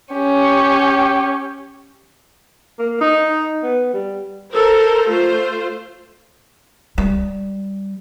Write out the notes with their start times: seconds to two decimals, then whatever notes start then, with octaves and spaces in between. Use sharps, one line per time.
0.14 C#4 G4
2.79 A#3
3.01 D#4
3.63 B3
3.93 G3
4.52 A4 A#4 C5
5.09 A3 F4 C5
6.98 G3